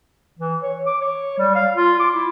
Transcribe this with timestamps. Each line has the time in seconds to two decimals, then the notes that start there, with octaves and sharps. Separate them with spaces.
0.39 E3
0.62 C#5
0.86 D6
1.01 C#5
1.38 G3
1.55 F5
1.75 F4
2.00 D6
2.14 E4